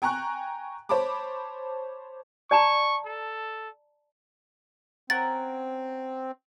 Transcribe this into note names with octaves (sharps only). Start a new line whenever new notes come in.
G5 G#5 A#5 C#6 F#6
C5 C#5 A5 B5 D6
D5 A5 A#5 C#6
A4
C4 C#4 A#4 F#5 A6